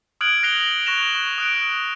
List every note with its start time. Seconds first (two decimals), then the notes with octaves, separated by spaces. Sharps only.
0.21 D#6 F6 F#6 G#6 D7 F#7
0.43 F#6 A#6 C7 F7 G7
0.86 C#6 F#6 A#6 E7 F7
1.15 C#6
1.38 D#6 F#6 D7